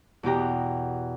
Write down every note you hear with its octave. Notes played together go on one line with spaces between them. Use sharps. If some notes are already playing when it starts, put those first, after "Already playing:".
E2 B2 G4 A#5